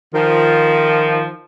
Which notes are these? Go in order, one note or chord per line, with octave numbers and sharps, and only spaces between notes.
D#3 F3